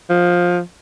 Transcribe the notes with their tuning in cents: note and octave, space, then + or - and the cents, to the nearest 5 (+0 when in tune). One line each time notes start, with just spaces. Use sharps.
F3 +15